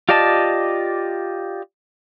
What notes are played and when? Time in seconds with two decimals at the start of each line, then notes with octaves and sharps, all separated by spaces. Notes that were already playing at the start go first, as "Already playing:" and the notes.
0.09 F4 G4 D5 D#5 A5